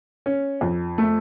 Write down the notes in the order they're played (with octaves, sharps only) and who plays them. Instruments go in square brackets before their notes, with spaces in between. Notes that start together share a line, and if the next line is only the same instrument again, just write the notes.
[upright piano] C#4
F2
A3